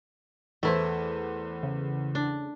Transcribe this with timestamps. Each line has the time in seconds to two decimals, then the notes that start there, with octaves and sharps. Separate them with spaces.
0.63 E2 A3 E4 B4 C5
1.63 C#3
2.15 D4